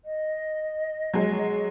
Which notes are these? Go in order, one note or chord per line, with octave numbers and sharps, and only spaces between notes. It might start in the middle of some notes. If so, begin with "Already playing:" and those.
D#5
F#3 G#3